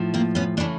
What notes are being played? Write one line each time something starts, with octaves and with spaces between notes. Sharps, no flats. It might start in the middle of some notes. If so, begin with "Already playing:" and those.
Already playing: A2 F3
A#3 C4
B3 C#4
C#3 E3 A3 D4